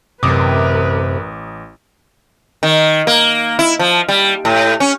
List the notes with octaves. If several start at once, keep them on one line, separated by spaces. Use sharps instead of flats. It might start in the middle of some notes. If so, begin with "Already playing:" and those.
A1 F#2 C3 A#4 B4 D6 D#6
D#3
A#3
E4
F3
G3
A2
C#4